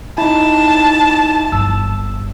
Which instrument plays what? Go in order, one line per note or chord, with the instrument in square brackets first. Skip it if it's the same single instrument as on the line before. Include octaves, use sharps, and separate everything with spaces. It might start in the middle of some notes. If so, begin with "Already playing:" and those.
[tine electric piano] D#4 E4 [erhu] A5
[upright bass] G1 [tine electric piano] E6